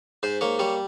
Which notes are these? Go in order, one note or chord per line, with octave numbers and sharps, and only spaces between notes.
G#2 C5
A#3 C#5
G3 C#5